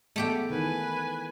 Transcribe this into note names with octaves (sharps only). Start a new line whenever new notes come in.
G#3 A3 B3 G4 G5
D#3 E3 B4 G#5